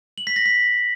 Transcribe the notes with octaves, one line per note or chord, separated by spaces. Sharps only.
F#7
B6
A#6
B6